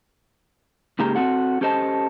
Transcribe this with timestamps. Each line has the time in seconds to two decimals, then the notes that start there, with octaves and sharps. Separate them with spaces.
0.99 G#2 C#3 A#3 G4 G#4 A#5
1.16 C4 F#4 A4 F#5
1.61 C#4 G4 A4 C5 D#5 A5